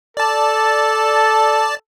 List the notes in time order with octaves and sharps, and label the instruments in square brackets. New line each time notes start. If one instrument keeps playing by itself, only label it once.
[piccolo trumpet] A4 [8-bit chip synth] D5 A5